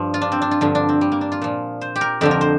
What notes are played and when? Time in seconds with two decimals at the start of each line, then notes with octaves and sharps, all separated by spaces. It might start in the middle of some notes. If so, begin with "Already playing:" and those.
Already playing: G2 F3
0.14 F4
0.21 D4
0.32 C4
0.42 D4
0.51 F4
0.61 G2 D3 F3
0.75 D4
0.89 C4
1.01 G3
1.12 A#3
1.21 D4
1.32 F4
1.41 A#2 F3
1.81 C5
1.96 G4
2.01 A#4
2.21 F2 D3 F3 G4
2.31 A#4
2.41 C5